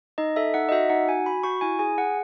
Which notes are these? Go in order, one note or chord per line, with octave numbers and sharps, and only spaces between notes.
D#4 D#5
A4 E5
D#4 F#5
D#5
F#4 E5
D#4 F#5
F#4 G#5
F#4 B5
F#4 C#6
E4 G#5
G#4 G#5
G#4 F#5